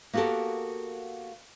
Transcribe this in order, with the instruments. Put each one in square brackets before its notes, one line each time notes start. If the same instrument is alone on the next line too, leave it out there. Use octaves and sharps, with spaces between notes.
[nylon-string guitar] A#3 B3 F#4 G4 A4 A#4